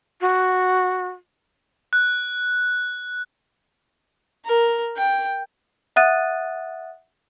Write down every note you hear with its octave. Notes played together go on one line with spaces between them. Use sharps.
F#4
F#6
A#4
G5
E5 F#5 D#6 F#6 A6 D#7